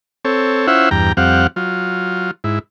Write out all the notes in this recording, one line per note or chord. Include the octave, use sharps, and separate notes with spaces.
C4 A4 C#5
C#4 E4 F4 C5 E5 F#5
E2 G2 G5 A#5
F2 G3 C4 F5 F#5
F#3 F4
G#2 E4